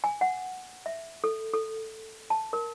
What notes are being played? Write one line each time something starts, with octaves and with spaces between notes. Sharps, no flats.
G#5
F#5
E5
A4
A4
A5
A#4